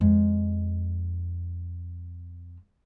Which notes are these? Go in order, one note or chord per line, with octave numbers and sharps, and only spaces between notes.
F2 G#3